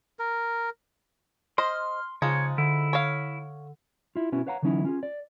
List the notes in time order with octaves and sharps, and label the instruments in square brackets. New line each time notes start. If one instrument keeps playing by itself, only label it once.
[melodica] A#4
[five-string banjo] C5 D#5 [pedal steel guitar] C6 [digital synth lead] F6
[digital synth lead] C#3 [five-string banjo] F3 G#3 D#4 [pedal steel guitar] C#5
[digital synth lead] D3 [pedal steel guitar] E4
[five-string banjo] C#5 F5
[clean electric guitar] E4 F4
B2 B3 C#4 E4 F#4
B4 C#5 F5 F#5 A#5
D3 E3 F#3 C#4 D#4 E4
C#4 F4 G#4
D5